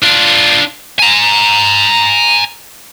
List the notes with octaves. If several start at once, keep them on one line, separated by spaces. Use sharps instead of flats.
D4 F4
G#5 A#5